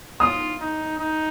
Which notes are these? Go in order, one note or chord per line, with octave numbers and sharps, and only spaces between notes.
F4 D#6
D#4
D#4